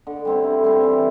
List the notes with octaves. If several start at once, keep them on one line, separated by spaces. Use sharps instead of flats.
D3
G3 C4 E4
D3
G3 C4 E4
E3